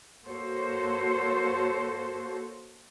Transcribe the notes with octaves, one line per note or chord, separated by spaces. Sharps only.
A#3 F#4 A4 C5 C#5